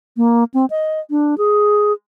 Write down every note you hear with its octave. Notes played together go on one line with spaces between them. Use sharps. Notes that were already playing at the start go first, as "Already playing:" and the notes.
A#3
C4
D#5
D4
G#4